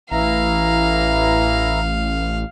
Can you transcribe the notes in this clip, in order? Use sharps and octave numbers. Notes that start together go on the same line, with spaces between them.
A1 E3 E4 F5 A#5